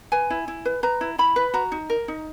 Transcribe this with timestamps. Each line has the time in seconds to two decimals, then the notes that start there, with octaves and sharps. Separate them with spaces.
0.12 B4 G#5
0.30 E4
0.48 E4
0.65 B4
0.83 B4 A#5
1.01 E4
1.18 E4 B5
1.36 B4
1.54 F#4 A#5
1.72 D#4
1.90 A#4
2.08 D#4